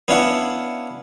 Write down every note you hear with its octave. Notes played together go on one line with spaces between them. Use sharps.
B3 C#4 D4 E4 F5 F#5